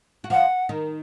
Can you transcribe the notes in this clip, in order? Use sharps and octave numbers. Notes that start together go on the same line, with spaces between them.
F#4
F3 F4 F#5
D#3 D#4